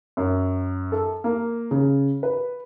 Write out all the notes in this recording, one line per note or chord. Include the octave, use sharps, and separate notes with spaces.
F#2
A4
A#3
C#3
B4